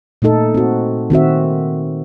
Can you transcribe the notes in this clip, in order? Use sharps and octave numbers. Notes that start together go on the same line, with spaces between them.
A#2 A3 D#4 A4
C4 F#4
D#3 C4 F#4 E5